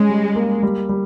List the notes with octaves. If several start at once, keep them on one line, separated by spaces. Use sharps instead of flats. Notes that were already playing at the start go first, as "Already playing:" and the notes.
Already playing: G#3 C#4
G3
A#3
G3
G3